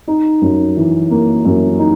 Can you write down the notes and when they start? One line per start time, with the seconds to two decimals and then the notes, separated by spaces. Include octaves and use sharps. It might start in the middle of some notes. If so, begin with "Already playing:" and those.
0.08 D#4
0.41 F#2
0.77 E3
1.10 A#3
1.45 F#2
1.79 D#4